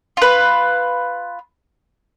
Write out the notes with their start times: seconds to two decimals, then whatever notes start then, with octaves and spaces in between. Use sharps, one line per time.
0.17 F4 B4